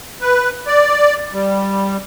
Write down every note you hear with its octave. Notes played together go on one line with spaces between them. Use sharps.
B4
D5
G3